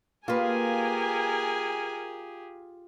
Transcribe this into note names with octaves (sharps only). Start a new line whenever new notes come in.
A#3 F4 G4 G#4 A#4 B4 G#5